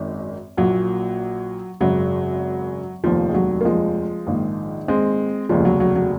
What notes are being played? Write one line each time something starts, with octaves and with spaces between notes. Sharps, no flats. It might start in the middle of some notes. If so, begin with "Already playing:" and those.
Already playing: G#1 F#2 D#3
A#1 A#2 F#3
G#1 F#2 C#3 F#3
F1 D#2 D#3 F3
G#3
F#3
A#3
F3 G#3
A#1 G#2 D#3
G#3 C4
F1 D#2 C#3 F3 G#3
F#3
F#3
F#3